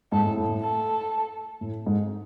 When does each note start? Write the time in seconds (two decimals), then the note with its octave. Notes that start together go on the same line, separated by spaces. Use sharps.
0.12 G#2 A4
0.25 A2
0.37 A2
0.49 A2
0.62 A4
1.61 A2
1.86 G#2